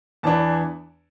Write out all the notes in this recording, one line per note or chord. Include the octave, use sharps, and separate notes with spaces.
E2 E3 B3 D4 A5